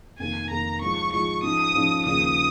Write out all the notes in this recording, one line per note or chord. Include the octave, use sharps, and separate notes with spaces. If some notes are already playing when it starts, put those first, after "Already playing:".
F1 F2 D#3 A#3 G#5
F1 F2 D#3 A#3 A#5
G#2 F3 G#3 F4 C#6
G#2 F3 G#3 F4 C#6
G#2 F3 C#4 D#6
G#2 F3 C#4
D#2 C#3 F3 D#6